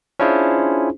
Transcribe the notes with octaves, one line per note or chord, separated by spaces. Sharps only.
C#4 D4 E4 F4 G#4 C5